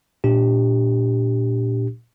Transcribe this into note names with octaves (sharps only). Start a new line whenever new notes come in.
A#2 D4 G4